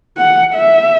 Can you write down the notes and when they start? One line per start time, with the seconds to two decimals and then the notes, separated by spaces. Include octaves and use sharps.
0.17 F#5
0.55 E5